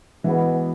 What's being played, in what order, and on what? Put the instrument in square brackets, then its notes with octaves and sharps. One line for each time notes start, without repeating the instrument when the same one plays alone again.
[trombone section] B2 G#3 B3 [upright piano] E3